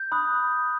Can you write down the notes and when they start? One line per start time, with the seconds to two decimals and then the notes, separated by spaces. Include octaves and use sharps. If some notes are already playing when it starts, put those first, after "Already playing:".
Already playing: G6
0.12 B5 D#6 F#6